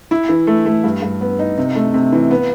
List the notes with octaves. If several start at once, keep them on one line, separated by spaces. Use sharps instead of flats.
E4
E3
A3
A3
G2
G2
B3
D#4
C3
A3
C3
E3
B3